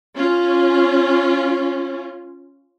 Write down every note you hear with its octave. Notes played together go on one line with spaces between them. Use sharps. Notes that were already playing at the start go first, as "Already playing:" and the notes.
C#4 F4